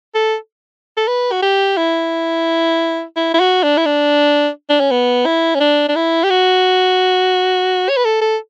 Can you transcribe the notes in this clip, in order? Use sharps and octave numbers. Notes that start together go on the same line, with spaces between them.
A4
A4
B4
F#4
G4
E4
E4
E4
F#4
D4
E4
D4
D4
C#4
B3
E4
C#4
D4
D4
E4
G4
F#4
C#5
B4
A4
A4